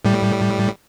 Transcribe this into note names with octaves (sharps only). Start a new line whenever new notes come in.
A2 G3